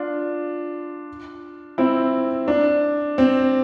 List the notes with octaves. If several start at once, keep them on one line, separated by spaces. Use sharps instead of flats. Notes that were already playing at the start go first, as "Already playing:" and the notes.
Already playing: D4 F4
C4 E4
D4
C4